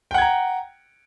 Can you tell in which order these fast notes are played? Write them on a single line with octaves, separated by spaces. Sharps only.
G5 F#5 G#6 A#5